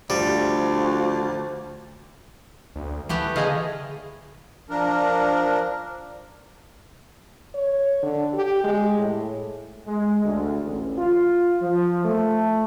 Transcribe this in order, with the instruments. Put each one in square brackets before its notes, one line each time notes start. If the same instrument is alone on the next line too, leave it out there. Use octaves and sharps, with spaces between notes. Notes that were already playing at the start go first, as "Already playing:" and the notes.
[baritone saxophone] D2 [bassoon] F3 [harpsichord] G3
[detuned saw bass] D2
[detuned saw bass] E3 [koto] A3 B3 G4
[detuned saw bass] D3 [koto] A3 E4 [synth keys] G#4 D#5 F5
[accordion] F3 D4 A#4
[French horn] C#5
D3
G4
G#3
A2
[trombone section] G#3
D2
A1
F4
F3
A3